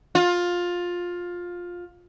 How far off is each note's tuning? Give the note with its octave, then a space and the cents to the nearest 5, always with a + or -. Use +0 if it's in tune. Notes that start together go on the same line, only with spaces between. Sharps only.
F4 +15